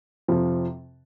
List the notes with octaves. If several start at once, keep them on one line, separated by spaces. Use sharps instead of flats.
F2 C3 F3